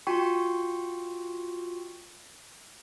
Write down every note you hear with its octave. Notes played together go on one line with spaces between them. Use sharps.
F4 F#4 G5 C6 C#6